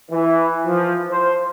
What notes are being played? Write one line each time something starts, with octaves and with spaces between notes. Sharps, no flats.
E3
F3
C5